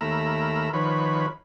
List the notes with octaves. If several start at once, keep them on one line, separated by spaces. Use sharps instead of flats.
D#2 A3 A#4 A#5 B5 E6
D#3 F3 B4 C#5 B5